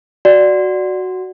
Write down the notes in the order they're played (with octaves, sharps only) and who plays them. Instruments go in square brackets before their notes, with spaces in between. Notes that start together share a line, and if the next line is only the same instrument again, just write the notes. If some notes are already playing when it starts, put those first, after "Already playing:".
[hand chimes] F#4 [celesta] D5